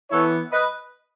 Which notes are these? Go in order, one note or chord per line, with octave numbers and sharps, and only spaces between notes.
E3 B3 E4 A4 C#5
B4 D#5